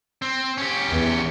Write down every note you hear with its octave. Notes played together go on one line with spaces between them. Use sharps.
C4
C#4 G4
E2